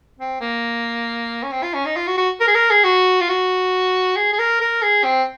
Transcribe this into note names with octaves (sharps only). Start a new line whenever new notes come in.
C4
A#3
C#4
C4
F4
C#4
D#4
F4
F#4
F#4
A#4
G#4
A#4
G#4
F#4
F4
F#4
G#4
G#4
A#4
A#4
G#4
C4